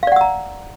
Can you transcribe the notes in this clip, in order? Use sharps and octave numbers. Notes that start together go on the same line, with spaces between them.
D5 F5 F#5 A#5 E6